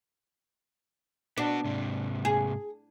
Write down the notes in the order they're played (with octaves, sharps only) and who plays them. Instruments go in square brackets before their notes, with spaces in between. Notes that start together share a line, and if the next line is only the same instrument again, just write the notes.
[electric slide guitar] B3 F#4 [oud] D4
[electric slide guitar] G#2 C3
[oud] G#4